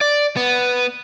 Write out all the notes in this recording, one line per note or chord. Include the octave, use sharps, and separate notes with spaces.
D5
B3